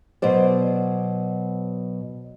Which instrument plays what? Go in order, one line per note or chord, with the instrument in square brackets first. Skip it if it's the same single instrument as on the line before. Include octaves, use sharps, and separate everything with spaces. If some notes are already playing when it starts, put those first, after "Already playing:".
[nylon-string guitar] B2 F#3 C5 D5